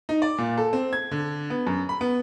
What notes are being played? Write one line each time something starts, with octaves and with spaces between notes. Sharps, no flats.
D#4
D5
A#2
A4
C4
G#6
D3
B3
F#2
B5
B3